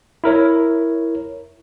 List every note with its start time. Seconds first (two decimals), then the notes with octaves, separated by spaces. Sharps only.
0.24 E4 A#4 C#5